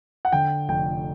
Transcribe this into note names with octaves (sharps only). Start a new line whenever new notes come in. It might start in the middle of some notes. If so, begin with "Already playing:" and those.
F#5
D3 G5
F1 G5